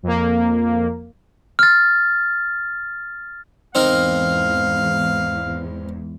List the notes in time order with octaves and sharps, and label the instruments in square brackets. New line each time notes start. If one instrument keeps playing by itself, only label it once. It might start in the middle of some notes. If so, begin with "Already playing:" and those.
[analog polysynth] F2 A#3
[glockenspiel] F6 A6
[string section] E2 G#2 [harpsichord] C4 D#4 A#4 [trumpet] F5